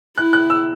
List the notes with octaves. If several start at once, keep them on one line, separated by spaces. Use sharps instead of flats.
E4 F#6
F#6
E6